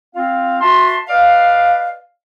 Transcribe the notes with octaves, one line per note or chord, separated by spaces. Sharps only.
C4 F4 F5
F#4 E5 A5 C6
B4 D5 D#5 F5